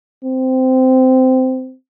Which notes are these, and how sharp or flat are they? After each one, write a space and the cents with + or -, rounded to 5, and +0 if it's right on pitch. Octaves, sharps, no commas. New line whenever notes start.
C4 -15